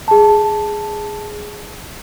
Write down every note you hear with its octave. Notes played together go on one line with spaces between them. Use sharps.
G#4 A5